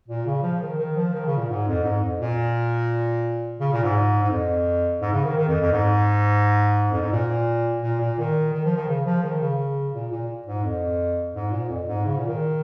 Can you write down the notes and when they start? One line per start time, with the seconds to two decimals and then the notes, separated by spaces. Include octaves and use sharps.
0.08 A#2
0.26 C#3
0.43 F3
0.62 D#3
0.78 D#3
0.96 F3
1.14 D#3
1.26 C#3
1.37 A#2
1.49 G#2
1.67 F2
1.84 G#2
2.01 F2
2.20 A#2
3.60 C#3
3.73 A#2
3.84 G#2
4.23 G#2
4.30 F2
5.01 G#2
5.13 C#3
5.24 D#3
5.37 D#3
5.48 F2
5.60 F2
5.72 G#2
6.92 F2
7.02 G#2
7.12 A#2
7.82 A#2
8.00 A#2
8.18 D#3
8.53 D#3
8.65 F3
8.76 D#3
8.88 C#3
9.05 F3
9.23 D#3
9.41 C#3
9.93 A#2
10.12 A#2
10.46 G#2
10.64 F2
11.34 G#2
11.51 A#2
11.69 F2
11.88 G#2
12.05 C#3
12.17 A#2
12.28 D#3